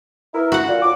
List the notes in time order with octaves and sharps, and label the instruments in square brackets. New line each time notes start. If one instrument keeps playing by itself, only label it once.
[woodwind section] B3 E4 A#4
[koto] F#4 F#5
[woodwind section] A#2
D#2 F#5 D6